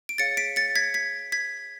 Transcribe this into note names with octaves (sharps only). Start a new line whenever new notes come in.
D7
G#4 C#5 F5 A6 C#7
B6 D7
A6 C#7
G#6 B6
G#6 B6
G#6 B6